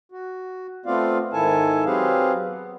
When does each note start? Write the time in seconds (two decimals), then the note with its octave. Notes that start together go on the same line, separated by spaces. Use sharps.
0.12 F#4
0.86 A3 B3 C4 F4 D5 F5
1.33 G#2 D#3 E4 A4 G#5 A5
1.85 F#3 C4 G4 G#4 B4 F5
2.48 B3